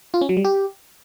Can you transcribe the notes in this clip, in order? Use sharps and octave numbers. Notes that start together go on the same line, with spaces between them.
F4
C#4
F#3
G3
G4